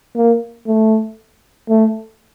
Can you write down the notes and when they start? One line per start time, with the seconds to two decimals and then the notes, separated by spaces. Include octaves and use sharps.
0.16 A#3
0.67 A3
1.69 A3